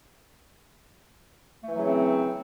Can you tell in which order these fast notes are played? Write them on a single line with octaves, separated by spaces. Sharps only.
A3 E3 F#3 C#3 C4